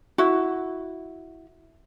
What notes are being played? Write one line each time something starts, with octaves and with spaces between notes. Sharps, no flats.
E4 F#4